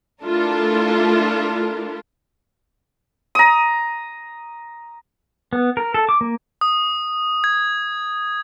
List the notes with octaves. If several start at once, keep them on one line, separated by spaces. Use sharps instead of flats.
A3 D4 E4 F4 A4 A#4
A#5 D#6
B3
A#4
A4
D6
A#3
D#6
G#6